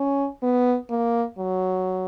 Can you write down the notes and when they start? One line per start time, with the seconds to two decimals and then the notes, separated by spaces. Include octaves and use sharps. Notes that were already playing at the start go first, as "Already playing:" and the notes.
Already playing: C#4
0.43 B3
0.90 A#3
1.39 F#3